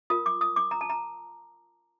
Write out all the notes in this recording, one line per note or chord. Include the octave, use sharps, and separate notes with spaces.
F4 A#4 D#6
D6
D#6
D6
A#5
A5
A#5